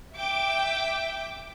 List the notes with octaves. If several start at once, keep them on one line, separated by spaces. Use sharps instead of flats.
E5 G5 D6